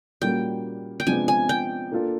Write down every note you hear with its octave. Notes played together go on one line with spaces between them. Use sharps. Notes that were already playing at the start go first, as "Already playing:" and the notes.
A#2 G3 A#3 C#4 F#4 G5
G5
C3 F3 G#3 B3 D4 G#5
G#5
G5
A#3 D4 F4 A4